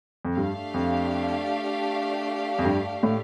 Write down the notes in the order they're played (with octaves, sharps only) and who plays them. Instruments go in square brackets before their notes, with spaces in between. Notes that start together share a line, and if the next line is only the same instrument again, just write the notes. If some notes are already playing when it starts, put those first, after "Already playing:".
[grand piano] F2
[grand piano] G2 [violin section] A3 D4 G4 F5
[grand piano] F2
F2
G2
A2